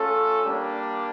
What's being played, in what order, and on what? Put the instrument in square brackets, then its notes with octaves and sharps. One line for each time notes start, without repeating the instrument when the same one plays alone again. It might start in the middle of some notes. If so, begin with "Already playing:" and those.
Already playing: [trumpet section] A3 C#4 F4 A4
G3 A#3 D4